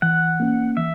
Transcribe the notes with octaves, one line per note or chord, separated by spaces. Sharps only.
E3 F#5
A#3 C#4
E3 E5